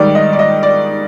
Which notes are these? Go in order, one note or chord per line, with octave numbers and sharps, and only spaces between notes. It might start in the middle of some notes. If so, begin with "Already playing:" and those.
Already playing: G#2 D#3 G3 D5
D#5
D5
D#5
D5